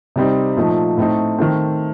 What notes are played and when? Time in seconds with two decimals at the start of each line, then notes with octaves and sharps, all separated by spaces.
0.16 C3 G3 C4 D#4
0.56 A#2 F3 A3 D#4
0.98 A2 A3 C4 D#4
1.39 D#3 A3 C4